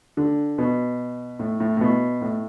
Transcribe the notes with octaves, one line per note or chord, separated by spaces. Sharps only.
D3
B2
A2
A2
A2
B2
A2